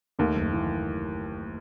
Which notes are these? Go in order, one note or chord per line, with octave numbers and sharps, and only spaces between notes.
D#2 D#3 A3
F#1
E3